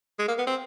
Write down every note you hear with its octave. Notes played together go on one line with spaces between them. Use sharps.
G#3
A#3
B3
C4